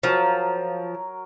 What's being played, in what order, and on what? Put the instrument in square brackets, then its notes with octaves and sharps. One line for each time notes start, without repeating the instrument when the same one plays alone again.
[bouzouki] F3 [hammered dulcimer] F#3 A#4